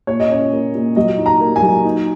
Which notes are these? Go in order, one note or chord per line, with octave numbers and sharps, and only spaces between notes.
A#2 C#5
D#5
C#4 C#5
A#3
A#2
F#3 D#5
D#4
A#5
A#3
G#5
F#3
D#4